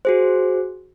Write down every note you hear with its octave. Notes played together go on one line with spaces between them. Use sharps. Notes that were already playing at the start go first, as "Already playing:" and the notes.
F#4 G#4 C5